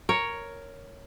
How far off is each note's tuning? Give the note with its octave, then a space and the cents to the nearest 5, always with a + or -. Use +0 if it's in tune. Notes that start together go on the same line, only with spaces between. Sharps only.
A#4 +0 C#5 +5